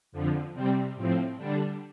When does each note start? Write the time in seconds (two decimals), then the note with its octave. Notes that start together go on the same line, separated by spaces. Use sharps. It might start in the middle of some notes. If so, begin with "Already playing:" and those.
0.12 F2 D3 F3
0.54 C3 G3 C4
0.95 A2 F3 C4
1.37 D3 G3 D4